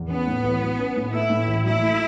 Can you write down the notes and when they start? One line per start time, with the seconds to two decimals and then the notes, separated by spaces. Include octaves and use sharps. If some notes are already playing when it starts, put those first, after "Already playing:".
Already playing: E2
0.10 B3 C#4
0.27 A2
0.44 A1
0.61 F#3
0.78 C#4
0.96 A2
1.12 A3 E4
1.30 A2
1.48 A1
1.64 F#3 E4
1.82 A3